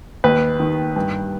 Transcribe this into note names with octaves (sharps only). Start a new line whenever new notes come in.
D#2 B4
D#3
G2